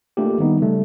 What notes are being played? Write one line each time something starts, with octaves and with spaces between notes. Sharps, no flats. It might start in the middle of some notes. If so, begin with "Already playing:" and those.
A3 A#3 D4 F4 G4
D#3 G3 B3 D#4
C#3 G3 A3